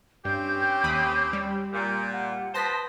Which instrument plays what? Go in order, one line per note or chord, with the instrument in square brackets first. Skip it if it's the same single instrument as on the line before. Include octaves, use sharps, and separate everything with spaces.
[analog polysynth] G2 [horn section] C4 C#4 G4 [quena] G6
[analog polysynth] D#2 B5 D#6
G3
[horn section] A#2 [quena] G6
[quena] F#5
[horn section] F3 B4 C5 [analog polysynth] A5 A#6 B6 [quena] D#6